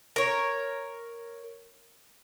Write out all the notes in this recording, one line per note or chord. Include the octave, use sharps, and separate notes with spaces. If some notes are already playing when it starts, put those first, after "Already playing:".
A#4 C#5